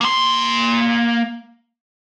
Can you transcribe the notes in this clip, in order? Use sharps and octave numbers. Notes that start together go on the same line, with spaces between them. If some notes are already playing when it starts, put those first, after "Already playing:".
A#3 C6